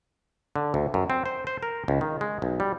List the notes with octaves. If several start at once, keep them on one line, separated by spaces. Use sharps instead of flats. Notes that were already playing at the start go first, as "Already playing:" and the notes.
D3
D2
F#2
C4
C5
C5
A#4
C#2
D#3
G#3
B1
G3